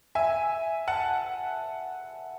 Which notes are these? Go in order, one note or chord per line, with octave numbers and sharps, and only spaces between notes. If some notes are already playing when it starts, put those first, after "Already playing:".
E5 G#5
F#5 A5